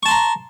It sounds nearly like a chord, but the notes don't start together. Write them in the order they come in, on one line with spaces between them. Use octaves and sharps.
C#6 A5 C6 A#5